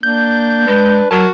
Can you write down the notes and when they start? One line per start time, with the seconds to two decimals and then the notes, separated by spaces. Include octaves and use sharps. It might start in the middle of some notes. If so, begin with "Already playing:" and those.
0.03 A#3 D4 G6
0.68 G#3 B4
1.11 F#3 F#4 A#4 A5